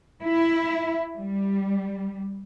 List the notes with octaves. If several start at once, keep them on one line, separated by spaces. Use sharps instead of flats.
E4
G3